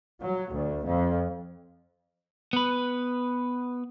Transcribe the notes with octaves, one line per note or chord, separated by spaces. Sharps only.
F#3
D2
F2
B3 B4